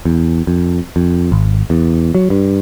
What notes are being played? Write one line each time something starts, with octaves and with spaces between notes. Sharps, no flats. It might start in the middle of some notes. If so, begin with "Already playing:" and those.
E2
F2
F2
G#1
E2
F#3
G2